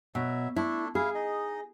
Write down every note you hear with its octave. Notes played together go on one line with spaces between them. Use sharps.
B2 F#3 E5
A3 D4 E4 A4
E4 G#4 F5
D#4 D#5